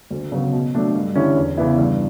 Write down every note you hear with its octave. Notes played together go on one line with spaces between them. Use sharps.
D2
C#3 F#3 B3
B2
F#3 A3 D4
G2
D3 G3 C#4 E4
E2
C#3 E3 B3 E4
G2